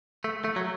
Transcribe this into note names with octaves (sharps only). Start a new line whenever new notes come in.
A3
A3
F#3